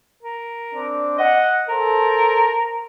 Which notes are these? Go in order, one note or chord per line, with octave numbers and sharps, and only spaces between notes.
A#4
C4 D4
D#5 F#5
A4 A#4 C5